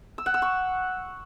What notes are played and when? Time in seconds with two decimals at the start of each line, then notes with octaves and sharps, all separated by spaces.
0.18 E6
0.26 F#5
0.34 E6
0.42 C#6